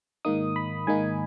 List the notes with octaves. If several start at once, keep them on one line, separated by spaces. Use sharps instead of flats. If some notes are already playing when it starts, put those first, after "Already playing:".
G#2 D#3 A#3 D#4 D#6
B5
G#2 D#3 A#3 D#4 G#5